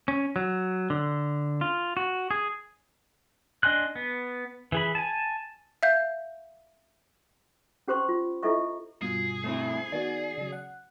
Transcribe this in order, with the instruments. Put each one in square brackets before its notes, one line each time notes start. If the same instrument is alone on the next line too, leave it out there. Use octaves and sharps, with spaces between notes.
[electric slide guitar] C#4
F#3
D3
F4
F#4
G#4
[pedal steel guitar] D4 D#5 G#5 C6 F#6
B3
E3 G#4 B5
G#5 A5
[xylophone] E5 F5 G6
[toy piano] C#4 G4 C5 C6 C#6
F4
E4 F4 A4 D#5 E5 C#6
[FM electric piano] G2 B2 F4 [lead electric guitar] G#4
[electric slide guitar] A3 C4 E4
[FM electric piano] D#3 B3 F#4 [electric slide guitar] D5
[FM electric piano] C#3 F#3
F#5